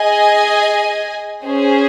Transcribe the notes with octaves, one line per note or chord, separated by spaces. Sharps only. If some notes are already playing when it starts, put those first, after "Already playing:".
Already playing: G#4 D#5 G#5
C#4 G#4 C5